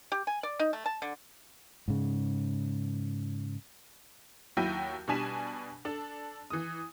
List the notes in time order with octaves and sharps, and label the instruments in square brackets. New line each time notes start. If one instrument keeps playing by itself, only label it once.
[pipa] G4
G#5
D5
D#4
A3
A5
D3
[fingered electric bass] G#2 C#3
[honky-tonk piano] D#2 F#3 E4 G5 G6 D#7
B2 G3 D4 G#5 B6 E7
D4 A4
E3 D#6